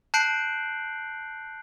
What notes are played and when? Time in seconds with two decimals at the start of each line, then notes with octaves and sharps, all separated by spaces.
0.14 A5 F#6 G6 C7 D7 F#7